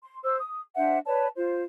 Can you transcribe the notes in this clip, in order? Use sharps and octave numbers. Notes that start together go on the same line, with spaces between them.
C6
C5 E6
D#6
D4 C5 E5 F#5
B4 C#5 D5 A5
F4 C5